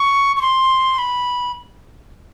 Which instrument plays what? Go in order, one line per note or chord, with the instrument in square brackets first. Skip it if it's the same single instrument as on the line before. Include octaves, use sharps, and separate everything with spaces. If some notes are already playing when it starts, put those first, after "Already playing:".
Already playing: [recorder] C#6
C#6
C6
B5